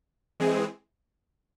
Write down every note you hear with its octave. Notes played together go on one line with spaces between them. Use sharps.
E3 G#3 C4 G#4